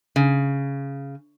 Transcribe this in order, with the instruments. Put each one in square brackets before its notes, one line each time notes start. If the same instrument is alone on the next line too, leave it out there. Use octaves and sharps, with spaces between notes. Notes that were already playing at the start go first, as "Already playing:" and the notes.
[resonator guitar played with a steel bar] C#3